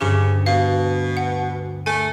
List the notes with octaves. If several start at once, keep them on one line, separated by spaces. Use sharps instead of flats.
D2 G2 C#3 D4 G4
B2 F5
F#5
A3 G#5